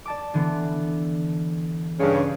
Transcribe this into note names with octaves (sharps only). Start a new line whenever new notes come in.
D5 A5 D6
D3 E3 B3
G2 C#3 C#4 C#5 F5